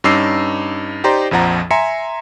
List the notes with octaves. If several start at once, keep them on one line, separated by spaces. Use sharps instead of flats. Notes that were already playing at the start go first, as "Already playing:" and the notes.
G2 C#4 D#4 D6 E6 C7
D#4 G4 C5 D5 A#5 C6
A#1 F2 F3 F#5 A#5
E5 G#5 A#5 C6 C#7